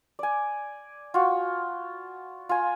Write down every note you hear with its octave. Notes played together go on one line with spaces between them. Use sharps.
D5 G#5
F4 F#4
F4 G#5